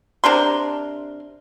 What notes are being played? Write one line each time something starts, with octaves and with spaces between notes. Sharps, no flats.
C3 D4 A#4 C6